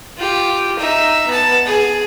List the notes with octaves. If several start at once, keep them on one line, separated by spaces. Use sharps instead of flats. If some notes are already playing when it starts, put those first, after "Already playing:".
F4 G4
D#4 E5
B3 A5
G#4